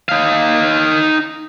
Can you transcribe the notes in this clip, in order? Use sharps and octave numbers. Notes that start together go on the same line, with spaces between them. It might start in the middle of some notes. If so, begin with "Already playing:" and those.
D#4 F5